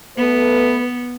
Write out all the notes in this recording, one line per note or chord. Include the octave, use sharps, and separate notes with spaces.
A3 B3 A4 B4